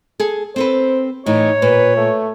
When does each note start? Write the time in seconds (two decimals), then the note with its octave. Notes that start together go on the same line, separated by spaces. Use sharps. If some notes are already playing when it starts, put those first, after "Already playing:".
0.20 G#4 A4
0.56 C4 A4 B4 C5
1.26 A2 E3 D#4 C#5
1.62 A#2 B4
1.98 A3